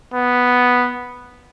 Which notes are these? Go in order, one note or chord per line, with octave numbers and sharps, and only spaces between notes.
B3